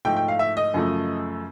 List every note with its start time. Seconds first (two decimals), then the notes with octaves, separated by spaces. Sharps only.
0.05 G#2 F3 A3 G5
0.16 G5
0.28 F5
0.39 E5
0.57 D#5
0.74 F#2 C#3 F3 A3